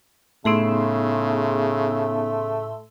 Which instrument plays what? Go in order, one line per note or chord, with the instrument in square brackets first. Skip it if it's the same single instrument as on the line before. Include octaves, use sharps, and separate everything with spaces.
[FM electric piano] A2 C6 E6 [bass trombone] C#3 [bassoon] A3 [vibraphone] B3 D#4 G#4